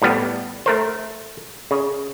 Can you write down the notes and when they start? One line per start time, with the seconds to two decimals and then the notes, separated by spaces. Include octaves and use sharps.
0.02 A2 F3 G3 B3
0.66 A3 A#4 C5
1.71 C#3